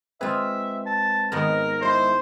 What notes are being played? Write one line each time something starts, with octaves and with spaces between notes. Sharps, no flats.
G#3 C4 F4 G#4 B4 E5
A5
G#2 D#3 B3 A#4
G#3 E4 C5